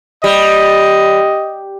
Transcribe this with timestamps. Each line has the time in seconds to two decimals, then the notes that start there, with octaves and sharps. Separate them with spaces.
0.24 G3 D#5